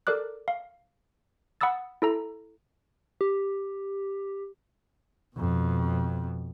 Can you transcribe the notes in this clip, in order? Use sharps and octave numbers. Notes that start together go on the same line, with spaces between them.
A4 A#4 D5 D6 F#6
F5
F#5 B5 D#6 E6 A6
E4 A4 A#5
G4
F2 B2